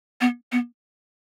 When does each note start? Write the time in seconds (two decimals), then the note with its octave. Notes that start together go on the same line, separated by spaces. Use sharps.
0.21 B3
0.52 B3